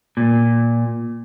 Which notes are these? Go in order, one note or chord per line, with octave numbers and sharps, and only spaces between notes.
A#2